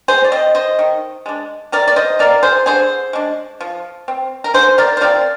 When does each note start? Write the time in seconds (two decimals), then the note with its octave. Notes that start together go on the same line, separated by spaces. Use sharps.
0.08 G#4 C5
0.24 D5
0.32 C4 C5 D#5
0.55 C5 D#5
0.79 D#3
1.26 G#3 D4
1.72 C3 A#4 D5
1.88 D5
1.96 C5 D#5
2.19 D#3 A#3 A#4 D5
2.43 G#4 C5
2.66 D3 G#4 C5
3.13 G#3 D4
3.61 F3
4.08 C4
4.44 A#4
4.54 D3 G#4 C5
4.78 A#4 D5
4.97 C5
5.01 F3 C4 A#4 D5